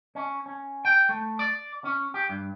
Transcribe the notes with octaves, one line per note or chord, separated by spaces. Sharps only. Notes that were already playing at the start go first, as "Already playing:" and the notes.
C#4
C#4
G5
A3
D5
C#4
G4
G2